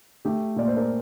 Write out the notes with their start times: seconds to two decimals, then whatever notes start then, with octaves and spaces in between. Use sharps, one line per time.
0.25 A3 G4
0.56 A#2 D5
0.68 C5
0.77 A#4